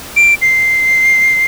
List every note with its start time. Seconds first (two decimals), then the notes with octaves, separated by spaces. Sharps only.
0.16 D7
0.42 C7